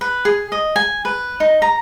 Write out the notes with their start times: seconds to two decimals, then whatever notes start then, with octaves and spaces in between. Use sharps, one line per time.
0.01 B4
0.25 G#4
0.52 D#5
0.76 G#5
1.05 B4
1.40 D#4
1.62 A#5